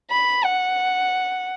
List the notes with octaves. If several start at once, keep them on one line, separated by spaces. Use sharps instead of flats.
B5
F#5